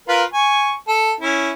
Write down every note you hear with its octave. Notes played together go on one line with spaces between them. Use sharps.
F4 A#4 B4
G#5 C#6
A4
C#4 E4